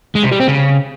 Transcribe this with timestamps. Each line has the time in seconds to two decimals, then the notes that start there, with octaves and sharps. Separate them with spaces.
0.15 G#3
0.23 C3
0.31 G3
0.40 C4
0.48 C#3